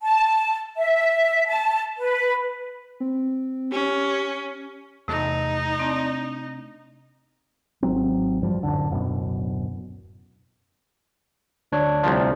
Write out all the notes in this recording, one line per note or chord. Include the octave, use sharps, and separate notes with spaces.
A5
E5
A5
B4
C4
C#4 G4
E2 C3 A3 D#4
C4 D4
G#1 F#3 C4
G2 F3 G3
D1 G#1 F#2 D3
D1 F#2 B2
D2 D4 C#5
C2 F3